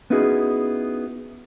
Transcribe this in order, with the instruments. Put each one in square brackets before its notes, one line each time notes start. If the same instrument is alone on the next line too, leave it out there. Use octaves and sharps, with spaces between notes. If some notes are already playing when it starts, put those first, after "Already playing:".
[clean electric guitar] B3 C#4 D#4 E4 F#4 G#4